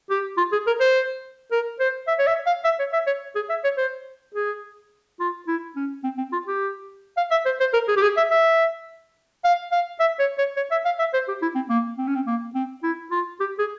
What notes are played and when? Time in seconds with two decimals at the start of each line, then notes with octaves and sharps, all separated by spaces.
0.10 G4
0.38 F4
0.52 G#4
0.67 A#4
0.80 C5
1.52 A#4
1.80 C5
2.07 E5
2.19 C#5
2.27 E5
2.46 F5
2.64 E5
2.79 C#5
2.93 E5
3.07 C#5
3.35 G#4
3.49 E5
3.64 C#5
3.77 C5
4.35 G#4
5.20 F4
5.48 E4
5.76 C#4
6.04 C4
6.18 C4
6.32 F4
6.47 G4
7.17 F5
7.31 E5
7.45 C5
7.60 C5
7.73 A#4
7.88 G#4
7.97 G4
8.02 G#4
8.17 E5
8.31 E5
9.44 F5
9.72 F5
10.00 E5
10.19 C#5
10.38 C#5
10.57 C#5
10.71 E5
10.85 F5
10.99 E5
11.13 C5
11.28 G4
11.42 E4
11.55 C4
11.69 A#3
11.98 C4
12.07 C#4
12.15 C4
12.27 A#3
12.55 C4
12.83 E4
13.11 F4
13.40 G4
13.59 G#4